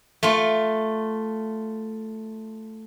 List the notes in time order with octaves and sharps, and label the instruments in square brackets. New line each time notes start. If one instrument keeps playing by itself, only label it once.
[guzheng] A3 F4